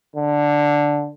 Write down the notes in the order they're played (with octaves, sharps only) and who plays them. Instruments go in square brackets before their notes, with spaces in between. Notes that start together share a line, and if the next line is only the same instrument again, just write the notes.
[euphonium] D3